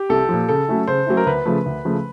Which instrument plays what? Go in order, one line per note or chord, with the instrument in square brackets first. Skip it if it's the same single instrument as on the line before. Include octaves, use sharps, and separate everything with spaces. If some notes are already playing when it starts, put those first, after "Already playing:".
Already playing: [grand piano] G4
[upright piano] C2 [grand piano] A4
[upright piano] A#2 F3
[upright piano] C#3 [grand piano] A4
[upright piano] F#3 A3 C#4 E4
[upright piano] C#3 [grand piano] C5
[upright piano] F#3 A3 C#4 E4
[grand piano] A#4
[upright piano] D2 [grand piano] B4
[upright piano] C#3 F3 A3
D2
C#3 F3 A3